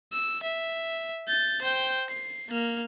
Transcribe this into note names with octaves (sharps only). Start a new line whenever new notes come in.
E6
E5
G6 A6
C5 G5
C7
A#3 F6